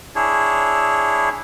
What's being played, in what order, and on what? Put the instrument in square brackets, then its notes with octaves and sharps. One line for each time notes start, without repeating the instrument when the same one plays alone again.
[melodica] D4 E4 G#4 C#5